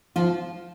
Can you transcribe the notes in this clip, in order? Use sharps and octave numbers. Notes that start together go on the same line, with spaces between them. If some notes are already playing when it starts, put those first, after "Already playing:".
F3 F4